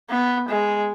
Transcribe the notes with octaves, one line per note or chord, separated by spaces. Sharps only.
B3
G#3